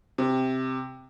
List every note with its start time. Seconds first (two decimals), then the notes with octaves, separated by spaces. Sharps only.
0.18 C3